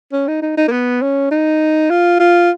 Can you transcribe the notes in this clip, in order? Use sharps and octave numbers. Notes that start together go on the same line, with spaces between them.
C#4
D#4
D#4
D#4
A#3
B3
C#4
D#4
F4
F4